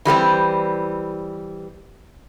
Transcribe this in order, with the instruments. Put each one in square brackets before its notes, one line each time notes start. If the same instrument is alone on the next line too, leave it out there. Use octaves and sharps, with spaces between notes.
[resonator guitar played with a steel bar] E3 G3 A#3 C4